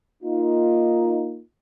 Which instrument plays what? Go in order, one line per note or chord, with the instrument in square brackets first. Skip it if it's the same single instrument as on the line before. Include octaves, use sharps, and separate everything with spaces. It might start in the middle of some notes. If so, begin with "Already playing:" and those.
[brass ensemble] A#3 D#4 F4